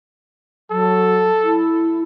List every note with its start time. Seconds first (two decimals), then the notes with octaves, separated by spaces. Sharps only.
0.71 F#3 A4
1.43 E4